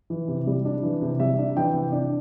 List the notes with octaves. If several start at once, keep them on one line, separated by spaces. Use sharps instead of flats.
E3
C3
G3
D4
E3
C3
G3 E5
D4
E3 G5
C3
D4